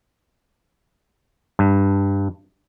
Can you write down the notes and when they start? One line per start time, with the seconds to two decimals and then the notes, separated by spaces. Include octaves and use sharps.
1.59 G2